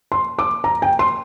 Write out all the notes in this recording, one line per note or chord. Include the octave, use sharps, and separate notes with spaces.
C6
D6
A#5
G5
C6